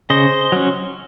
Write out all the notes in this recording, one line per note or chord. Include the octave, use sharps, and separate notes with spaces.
C#3 C5 D#5
F#3 C#4